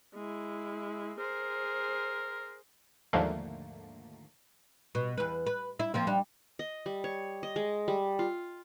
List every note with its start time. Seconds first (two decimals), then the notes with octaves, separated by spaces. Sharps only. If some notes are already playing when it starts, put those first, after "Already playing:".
0.15 G#3 E4
1.19 G#4 A#4 C5
3.13 D#2 G#2 D3 F3 A3 A#3
4.95 B2
5.18 E2 B4
5.47 B4
5.79 E4
5.94 F3 A#3 C4
6.07 G3 D4
6.59 D#5
6.86 G3
7.04 C#5
7.43 D#5
7.56 G#3
7.88 G3
8.19 F4